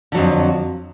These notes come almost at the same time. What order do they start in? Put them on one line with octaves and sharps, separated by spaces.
D3 F#3 F2